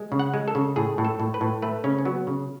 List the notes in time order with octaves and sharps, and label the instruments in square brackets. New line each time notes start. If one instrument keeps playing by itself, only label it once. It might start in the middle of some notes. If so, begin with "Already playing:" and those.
Already playing: [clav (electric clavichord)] G#3
C#3
F#5
G#3
A4
C#3
A2 G#4
A2
A4
A2
B4
A2
A3 B4
C#3 C#4
C#4
F#3 B3
C#3